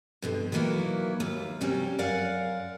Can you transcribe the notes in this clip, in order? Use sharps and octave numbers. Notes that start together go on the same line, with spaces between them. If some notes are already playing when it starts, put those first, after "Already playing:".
G2 B2 D3
D#3 E3 F#3 A#3 E4
D#2 F4
C3 F#3 G3 C#4
F#2 A#4 D5 F5 F#5 G#5